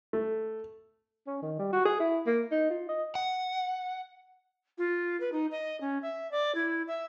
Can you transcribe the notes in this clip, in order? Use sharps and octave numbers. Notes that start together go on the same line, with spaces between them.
A3
C#4
D#3
G3
F#4
G#4
E4
A#3
D#4
F4
D#5
F#5
F4
B4
D#4
D#5
C#4
E5
D5
E4
E5